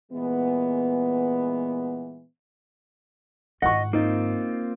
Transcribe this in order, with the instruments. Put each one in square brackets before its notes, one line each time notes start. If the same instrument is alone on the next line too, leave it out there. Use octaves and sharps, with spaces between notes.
[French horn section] A#2 E3 G#3 B3
[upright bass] G#2 D#3 [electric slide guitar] D#5 [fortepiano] F#5 C#6
[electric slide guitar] A#3 C4 F4 [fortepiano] D#4